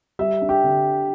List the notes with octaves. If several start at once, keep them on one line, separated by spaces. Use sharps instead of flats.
G3 E5
D4
G4
D3